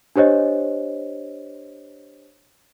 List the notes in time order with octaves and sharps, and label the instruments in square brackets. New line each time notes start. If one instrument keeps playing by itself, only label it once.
[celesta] D4 G4 C5 C#5 D#5